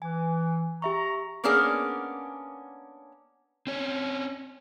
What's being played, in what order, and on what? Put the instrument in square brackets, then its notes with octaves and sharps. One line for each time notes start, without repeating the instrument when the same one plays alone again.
[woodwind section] E3 [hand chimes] G#5
[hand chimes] G4 E5 C#6 [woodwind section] A#5
[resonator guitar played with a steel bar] A#3 B3 C#4 D4 G#4 A#4
[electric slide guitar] C4 C#4 C#5